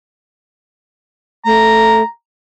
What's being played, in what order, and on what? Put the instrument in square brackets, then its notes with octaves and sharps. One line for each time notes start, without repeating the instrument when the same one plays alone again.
[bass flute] A3 [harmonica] A#5